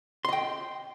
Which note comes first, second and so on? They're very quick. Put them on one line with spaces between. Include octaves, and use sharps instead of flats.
C6 D#5 G5